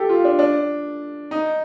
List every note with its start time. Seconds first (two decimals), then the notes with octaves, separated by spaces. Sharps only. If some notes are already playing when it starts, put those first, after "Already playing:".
Already playing: G4 A4
0.09 F4
0.24 D4
0.39 D4
1.31 D#4